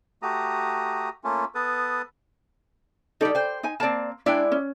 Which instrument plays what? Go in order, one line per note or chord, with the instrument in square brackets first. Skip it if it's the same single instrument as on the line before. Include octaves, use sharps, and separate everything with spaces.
[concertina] A3 F#4 G4 A#5 D#6
A3 A#3 C#4 F4
B3 A4 B4 D#6
[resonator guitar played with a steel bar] G3 D#4 [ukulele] A4 D5
[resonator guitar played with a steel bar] C5 G5
[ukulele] D#4 G#5
[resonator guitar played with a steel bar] A#3 C4 [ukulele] D5 A5
[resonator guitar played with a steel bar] G#3 E4 D5 [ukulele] D4 G5
[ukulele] C#4